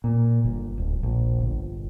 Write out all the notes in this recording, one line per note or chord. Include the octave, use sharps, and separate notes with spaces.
A#2
G1
D1
A#1
G1